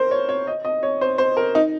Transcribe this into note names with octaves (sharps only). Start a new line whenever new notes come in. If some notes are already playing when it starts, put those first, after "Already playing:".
Already playing: A#4 C5
C#5
C#5
D#5
D#5
C#5
C5
C5
A#4
D#4